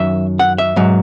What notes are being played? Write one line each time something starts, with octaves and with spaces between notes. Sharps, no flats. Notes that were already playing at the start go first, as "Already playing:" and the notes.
Already playing: F#2 D#3 F#3 E5
F#5
E5
G#2 F#3